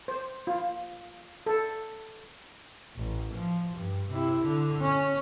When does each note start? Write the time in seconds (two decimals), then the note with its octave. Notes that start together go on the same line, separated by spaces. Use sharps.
0.08 C5
0.47 F4
1.46 A4
2.97 A1
3.33 F3
3.74 G2
4.11 C3 E4
4.44 D3
4.82 C#4